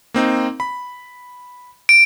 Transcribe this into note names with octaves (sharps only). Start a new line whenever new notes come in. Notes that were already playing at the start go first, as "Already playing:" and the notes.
A#3 C4 D#4
B5
D7